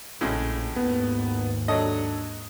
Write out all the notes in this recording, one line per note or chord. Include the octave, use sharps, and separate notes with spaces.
A#1 A2 C#3 G#3
G#1 D#2 B3
F#3 D4 A4 C#5 D#5